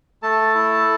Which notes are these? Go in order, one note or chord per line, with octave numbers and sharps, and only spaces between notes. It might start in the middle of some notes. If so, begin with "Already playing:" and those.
A3 A4 A5
E4